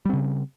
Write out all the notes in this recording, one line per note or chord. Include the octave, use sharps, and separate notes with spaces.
C#3 G3 C4